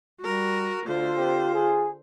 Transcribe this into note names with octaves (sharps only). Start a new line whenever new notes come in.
G3 F#4 A#4
D2 D3 F4 C5
C4 G4
G#4